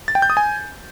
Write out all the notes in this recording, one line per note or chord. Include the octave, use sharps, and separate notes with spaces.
A6
G5
G6
D#6
G#5